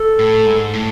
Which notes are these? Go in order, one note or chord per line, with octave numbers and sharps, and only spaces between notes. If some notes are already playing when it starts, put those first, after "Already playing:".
Already playing: A4
A2
G#2
A2